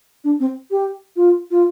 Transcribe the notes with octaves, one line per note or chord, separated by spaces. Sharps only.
D4
C4
G4
F4
F4